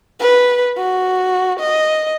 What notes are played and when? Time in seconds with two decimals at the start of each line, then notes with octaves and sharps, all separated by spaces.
0.20 B4
0.78 F#4
1.60 D#5